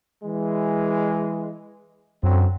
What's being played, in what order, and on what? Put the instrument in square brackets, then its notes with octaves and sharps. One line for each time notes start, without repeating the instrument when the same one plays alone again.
[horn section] E3 G#3
[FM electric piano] F#2 [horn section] D3 F#3 C4